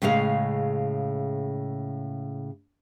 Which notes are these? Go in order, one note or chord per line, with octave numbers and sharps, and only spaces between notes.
A2 C#3 G#3 G#4 F5